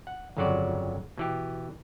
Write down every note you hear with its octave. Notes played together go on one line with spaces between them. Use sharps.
F#5
G1 F2 C#3 F#3 F#4 D5
B2 E3 G4